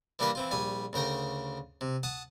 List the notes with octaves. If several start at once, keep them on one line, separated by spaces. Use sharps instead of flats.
E3 G3 A#3 D4 A#4 B4
E3 C4 F4
A#1 G3 G#5
D2 C#3 A#4 G5 A#5
C3
F#5 A5 D#6